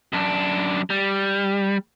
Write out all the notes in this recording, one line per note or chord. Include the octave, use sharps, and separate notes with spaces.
F#2 D4
G3